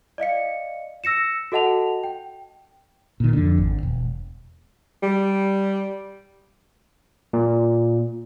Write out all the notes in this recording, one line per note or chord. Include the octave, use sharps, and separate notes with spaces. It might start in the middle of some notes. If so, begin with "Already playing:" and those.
D5 D#5 F5 C#7
E6 A#6 C#7 E7
F#4 A4 D#5 F#5 A5 F7
G5
A#2 D#3
F2 D3
G#1
E1
G3
A#2